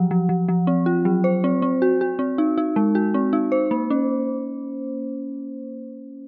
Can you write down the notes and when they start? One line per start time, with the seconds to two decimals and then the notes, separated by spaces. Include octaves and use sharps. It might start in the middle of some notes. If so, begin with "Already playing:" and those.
Already playing: F3 F#3
0.11 F3
0.29 F3
0.49 F3
0.67 C4
0.86 F4
1.05 F#3
1.24 C5
1.44 C4
1.62 C4
1.82 F#4
2.01 F#4
2.19 C4
2.38 D#4
2.58 D#4
2.76 G#3
2.95 F#4
3.14 C4
3.33 D#4
3.52 C5
3.71 A#3
3.90 C#4